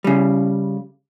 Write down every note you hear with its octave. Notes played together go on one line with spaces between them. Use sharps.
C#3 G3